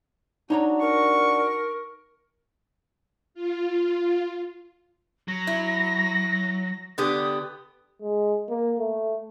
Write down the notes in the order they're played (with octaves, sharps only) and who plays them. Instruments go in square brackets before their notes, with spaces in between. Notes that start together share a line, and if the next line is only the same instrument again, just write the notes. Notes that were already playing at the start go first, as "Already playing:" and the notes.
[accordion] D4 F#4 [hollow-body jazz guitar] D#4 C#5 A#5
[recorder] A#4 [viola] C#6
[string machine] F4
[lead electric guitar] F#3 [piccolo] A#6
[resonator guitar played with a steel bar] E4
[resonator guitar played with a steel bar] D3 B3 G4 [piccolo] D#6
[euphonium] G#3
A#3
A3